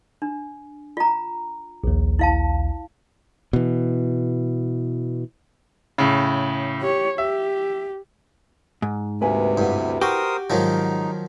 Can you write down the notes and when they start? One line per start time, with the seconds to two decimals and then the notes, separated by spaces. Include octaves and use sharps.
0.22 D4
0.97 F4 A#5
1.84 A#1 D#2
2.19 E4 F5 A5
3.53 B2 E3
5.98 A2 C#3
6.81 G4 C#5
7.18 G4 E5
8.82 G#2
9.21 D2 C3 A#3 B4 G#5
9.58 G2 B3 E4
10.02 F#4 G4 A#4 C5 D#6
10.50 G#2 D#3 F3 F#3 D#4